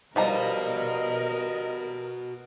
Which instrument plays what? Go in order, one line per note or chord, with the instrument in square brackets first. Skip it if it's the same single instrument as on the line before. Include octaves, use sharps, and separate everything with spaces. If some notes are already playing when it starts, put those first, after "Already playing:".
[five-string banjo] F3 G3 A#5 [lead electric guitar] F#4 B4 [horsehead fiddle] A#4 [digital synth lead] D#5